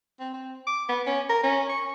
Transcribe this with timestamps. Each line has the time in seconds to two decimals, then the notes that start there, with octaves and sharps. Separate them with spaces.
0.20 C4
0.34 C4
0.67 D6
0.89 B3
1.07 C#4
1.29 A#4
1.43 C#4
1.69 C#6